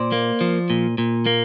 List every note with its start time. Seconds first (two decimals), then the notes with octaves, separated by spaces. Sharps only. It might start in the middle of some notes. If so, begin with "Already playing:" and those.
Already playing: A#2 C5 D5
0.12 A#3
0.41 F3
0.70 A#2
0.98 A#2
1.26 A#3